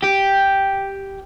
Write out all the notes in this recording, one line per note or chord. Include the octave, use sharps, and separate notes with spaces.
G4